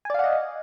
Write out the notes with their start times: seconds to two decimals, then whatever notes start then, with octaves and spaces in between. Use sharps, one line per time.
0.05 G#5
0.10 D5
0.14 F5
0.19 F#5
0.24 D#5